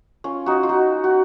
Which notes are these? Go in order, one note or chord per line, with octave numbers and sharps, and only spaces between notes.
C#4 F4
D#4 F#4
F4
D#4 F#4
F#4